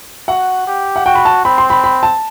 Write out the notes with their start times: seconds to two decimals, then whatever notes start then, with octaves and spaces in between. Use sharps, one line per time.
0.28 F#4 F#5
0.67 G4
0.96 F#5
1.06 F#4 G5
1.15 B5
1.25 A5
1.45 C4 B5
1.58 C6
1.70 B5
1.84 B5
2.03 A5